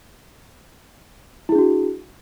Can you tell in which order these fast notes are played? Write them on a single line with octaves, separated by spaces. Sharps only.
E4 G#4 D4 F#4